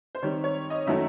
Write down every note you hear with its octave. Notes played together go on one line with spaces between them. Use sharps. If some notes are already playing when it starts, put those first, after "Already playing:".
C5
D#3 G3 C4 C#5
C#5
D#5
D#3 F#3 A3 C#4 E4 E5